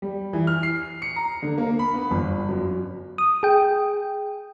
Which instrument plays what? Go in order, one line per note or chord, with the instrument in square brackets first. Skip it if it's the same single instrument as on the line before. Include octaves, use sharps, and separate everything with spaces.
[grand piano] G3
E3
F6
C7
C#7
A#5
D3
A#3
B5
B3
G1
F#2
[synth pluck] D#6
G#4 G5